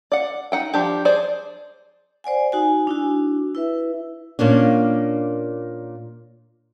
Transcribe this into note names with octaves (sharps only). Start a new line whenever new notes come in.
D5 F#5
D#4 F#5 G5
F3 D4 G4
G#4 C5 D5
C5 D5 F#5 G#5
D#4 F#4 G#5
D4 E4 F#4
E4 B4 E5
A#2 A#3 C#4 D4